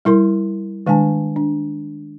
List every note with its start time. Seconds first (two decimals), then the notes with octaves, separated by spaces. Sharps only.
0.05 G3 E4 A#4 C6
0.86 D#3 G#3 D4 G#5 A5
1.36 D4